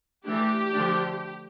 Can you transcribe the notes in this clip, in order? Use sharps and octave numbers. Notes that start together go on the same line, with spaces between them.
E3 A3 D4 G4
D3 F3 A3 D4